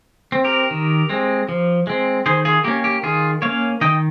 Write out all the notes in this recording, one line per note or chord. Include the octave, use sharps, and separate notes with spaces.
C4
G4 A#4
D#3
G#3 C4
F3
G#3 C4
D#3 G#4 C5
F4 G#4
A#3 C#4 G4
G4
D#3 F4 G#4
A#3 C#4 C#5 F5
D#3 D#5 G5